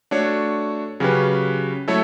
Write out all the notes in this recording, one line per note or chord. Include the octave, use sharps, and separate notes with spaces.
A3 D4 F#4 C#5
C#3 F#3 C#4 G4 B4
F#3 A3 E4 A4 C#5